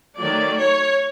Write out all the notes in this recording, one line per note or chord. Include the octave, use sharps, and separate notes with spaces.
D#3 F#3 A3 D5
C#5